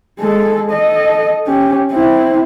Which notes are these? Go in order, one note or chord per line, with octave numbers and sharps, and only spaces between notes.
G#3 A4
A4 D#5
C#4 G4
C4 E4